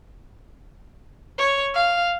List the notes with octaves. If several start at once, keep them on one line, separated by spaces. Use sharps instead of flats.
C#5
F5